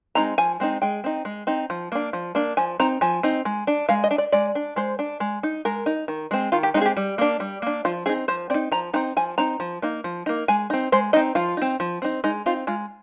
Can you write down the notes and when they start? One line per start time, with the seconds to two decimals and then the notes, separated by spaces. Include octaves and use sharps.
0.15 G#3 C4 D#4 A#5
0.38 F3 G#5
0.60 G#3 C4 D#4
0.82 G#3 G5
1.04 C4 D#4
1.25 G#3
1.47 C4 D#4
1.70 F3
1.92 A#3 D4
2.13 F3
2.35 A#3 D4
2.57 F3 G#5
2.80 C4 D#4 A#5
3.01 F3 G#5
3.23 C4 D#4
3.45 G#3
3.67 D4
3.89 G#3 F5
4.04 D#5
4.11 D4
4.18 D5
4.32 G#3 D5
4.55 D4
4.76 G#3 C5
4.99 D4
5.20 G#3
5.43 D#4
5.65 G#3 A#4
5.86 D#4
6.08 D#3
6.31 G#3 C4
6.52 D#3 F4
6.63 G4
6.74 G#3 D#4
6.77 C4 G#4
6.86 G4
6.97 G3
7.18 A#3 D4
7.40 G3
7.62 A#3 D4
7.85 F3 F4
8.06 C4 D#4 G#4
8.28 F3 C5
8.50 C4 D5
8.54 D#4
8.72 F3 A#5
8.94 C4 D#4 A#5
9.17 F3 G#5
9.38 C4 D#4 A#5
9.60 F3
9.82 A#3 D#4
10.04 F3
10.26 A#3 D#4
10.48 G#3 G#5
10.70 C4 D#4
10.92 G#3 C5
11.13 C4 D#4 D#5
11.35 F3 F4
11.57 C4 D#4
11.80 F3
12.02 C4 D#4
12.24 G#3 D#4
12.46 C4 D#4 F4
12.67 G#3 F4